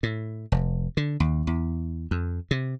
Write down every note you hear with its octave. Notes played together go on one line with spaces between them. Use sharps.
A2
F1
D3
D#2
E2
F2
C3